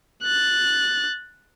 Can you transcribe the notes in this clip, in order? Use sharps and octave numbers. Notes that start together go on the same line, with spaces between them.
F#6 A6